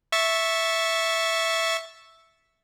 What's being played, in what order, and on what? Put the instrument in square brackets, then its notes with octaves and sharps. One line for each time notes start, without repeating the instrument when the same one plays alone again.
[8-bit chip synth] E5 C#6 A6